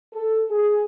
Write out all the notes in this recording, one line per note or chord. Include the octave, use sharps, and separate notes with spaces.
A4
G#4